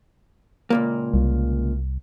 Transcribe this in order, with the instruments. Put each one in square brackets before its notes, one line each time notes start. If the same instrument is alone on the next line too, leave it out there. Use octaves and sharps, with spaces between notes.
[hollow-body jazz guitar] C#2 A#2 A#3
[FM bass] C2